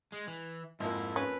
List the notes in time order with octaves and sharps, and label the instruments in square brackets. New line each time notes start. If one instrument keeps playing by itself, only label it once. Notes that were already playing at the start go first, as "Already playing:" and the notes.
[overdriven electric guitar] G#3
E3
[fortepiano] F2 F3 A#3 [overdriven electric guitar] G#2 [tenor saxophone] E4
[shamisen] C#4 [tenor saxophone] B4